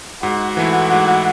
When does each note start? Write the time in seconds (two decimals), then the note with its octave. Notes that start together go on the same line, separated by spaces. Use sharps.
0.22 G#2 F#4
0.57 E3 A3 E4
0.91 G#2